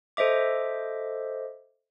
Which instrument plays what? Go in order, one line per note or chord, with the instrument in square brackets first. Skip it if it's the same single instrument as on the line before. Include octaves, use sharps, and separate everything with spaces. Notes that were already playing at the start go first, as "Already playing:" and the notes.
[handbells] A4 C5 D#5 E5 D6